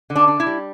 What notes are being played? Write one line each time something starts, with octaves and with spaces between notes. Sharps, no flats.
D3
D4
D4
E4
G3